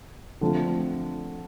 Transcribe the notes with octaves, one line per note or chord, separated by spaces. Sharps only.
D3 F3 A3 C4 F4